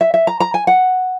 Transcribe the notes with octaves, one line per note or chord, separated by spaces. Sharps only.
E5
E5
A#5
A#5
G#5
F#5